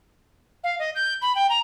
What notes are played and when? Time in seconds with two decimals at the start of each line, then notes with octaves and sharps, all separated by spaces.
0.64 F5
0.79 D#5
0.95 G6
1.22 B5
1.35 G5
1.50 A#5